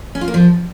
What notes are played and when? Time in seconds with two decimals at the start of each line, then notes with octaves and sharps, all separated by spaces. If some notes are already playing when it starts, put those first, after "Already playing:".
0.15 C#4
0.21 F4
0.28 A#3
0.34 F3